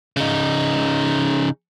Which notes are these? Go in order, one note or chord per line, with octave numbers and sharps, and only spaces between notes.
C#3 D#4